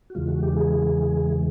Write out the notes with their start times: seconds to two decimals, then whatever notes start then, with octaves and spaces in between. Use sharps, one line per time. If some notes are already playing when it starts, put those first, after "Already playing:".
0.10 F#4
0.15 E2 C#3 E3 G#3 F4
0.28 F#4
0.43 G4
0.56 G#4